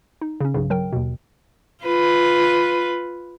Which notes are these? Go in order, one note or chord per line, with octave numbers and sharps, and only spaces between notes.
D#4
C#3 C#4
B1 G2 C#3
F#3 A#4 G5
D#2 B2
F4 B4